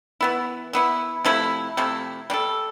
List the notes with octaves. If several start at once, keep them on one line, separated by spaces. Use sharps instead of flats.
E3 B3 E4
E3 B3 E4
C3 F3 A3 E4
C3 F3 A3 E4
G3 D4 A4